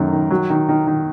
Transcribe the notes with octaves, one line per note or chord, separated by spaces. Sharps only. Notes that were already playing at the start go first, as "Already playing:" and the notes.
Already playing: F#2 D#3 A3
D#3
F#3
D#3
D#3
D#3